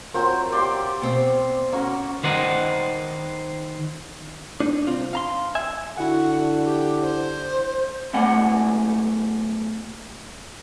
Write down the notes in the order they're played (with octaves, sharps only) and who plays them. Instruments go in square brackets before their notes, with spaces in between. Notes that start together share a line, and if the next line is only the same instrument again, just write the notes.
[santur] F#3 C4 F4 [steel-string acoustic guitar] A#4
[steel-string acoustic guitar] G4 [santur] D5 F5 C6
[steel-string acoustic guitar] B2 C4
[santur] A#3 F#4 A#4 [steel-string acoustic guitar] C#4
[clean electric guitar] D#3 A#4 C5 D5 D#5 F#5
D4 D#4
C2 C4 F4
F5 A#5 C6
E5 G#5
[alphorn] D3 [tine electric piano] E4 F#5 [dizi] F#4
[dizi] G4
C5
[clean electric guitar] B1 A3 A#3 D5 F#5 G#5